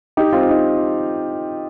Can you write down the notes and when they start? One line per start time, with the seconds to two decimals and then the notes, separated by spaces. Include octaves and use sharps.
0.17 D#4 G4
0.33 C4 F4
0.49 D#4